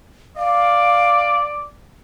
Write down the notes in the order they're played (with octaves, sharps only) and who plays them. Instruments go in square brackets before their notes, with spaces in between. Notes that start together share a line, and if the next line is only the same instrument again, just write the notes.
[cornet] D5 [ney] F5